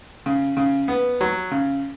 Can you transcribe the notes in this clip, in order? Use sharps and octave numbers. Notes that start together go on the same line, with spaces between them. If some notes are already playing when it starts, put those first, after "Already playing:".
C#3
C#3
B3
F#3
C#3